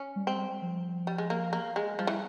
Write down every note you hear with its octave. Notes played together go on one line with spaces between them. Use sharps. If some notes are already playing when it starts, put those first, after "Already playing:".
Already playing: C#4
G3
C4
G3
F3
G3
G#3
A#3
A#3
G#3
F3 G3
E3